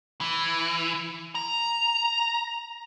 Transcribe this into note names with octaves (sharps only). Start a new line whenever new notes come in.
E3
A#5